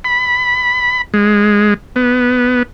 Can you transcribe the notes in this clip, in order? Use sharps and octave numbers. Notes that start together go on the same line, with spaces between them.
B5
G#3
B3